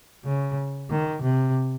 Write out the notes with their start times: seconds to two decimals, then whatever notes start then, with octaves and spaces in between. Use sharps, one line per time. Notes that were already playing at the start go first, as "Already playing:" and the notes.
0.25 C#3
0.90 D#3
1.22 C3